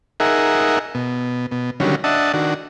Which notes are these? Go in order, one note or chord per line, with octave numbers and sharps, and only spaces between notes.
D#4 G#4 A#4 E5 F#5
B2
B2
D3 D#3 F#3 G3 C#4
D4 D#5 E5 F#5 A5
D#3 D4 F#4